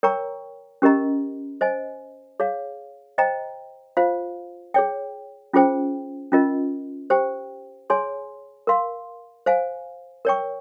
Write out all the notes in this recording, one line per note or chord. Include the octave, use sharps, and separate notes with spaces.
A#4 C#5 G5 A#5 C#6
C#4 G4 A#4 D#5 A#5
C5 D#5 G#5
G#4 C#5 F5
C5 D#5 G5 A#5
F4 C5 F5
G#4 C#5 G5
C#4 F4 G#4 C5 G5
C#4 F4 A#4 D#5
G4 C5 G5
G#4 C#5 G#5 C6
A#4 F5 C6
C5 F5 G#5
A#4 C#5 G5 C#6